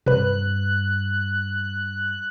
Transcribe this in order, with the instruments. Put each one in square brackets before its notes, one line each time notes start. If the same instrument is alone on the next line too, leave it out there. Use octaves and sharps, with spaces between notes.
[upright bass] G2 [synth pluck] C3 B4 [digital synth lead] F#6